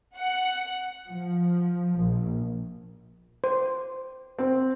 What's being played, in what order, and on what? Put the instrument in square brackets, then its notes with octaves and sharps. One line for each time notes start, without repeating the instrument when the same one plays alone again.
[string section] F#5
F3
A#1
[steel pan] C5
[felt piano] C4